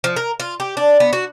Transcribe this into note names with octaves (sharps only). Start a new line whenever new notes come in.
F3
A#4
F4
G4
D4
B3
F#4